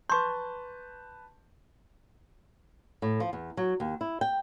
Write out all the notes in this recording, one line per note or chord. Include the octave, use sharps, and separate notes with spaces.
B4 A5 C6 C#6 G6
A2
F3
E2
F#3
D#2
E4
G5